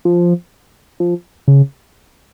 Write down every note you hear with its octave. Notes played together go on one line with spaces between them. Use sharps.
F3
F3
C#3